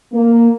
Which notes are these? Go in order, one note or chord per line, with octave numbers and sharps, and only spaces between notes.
A#3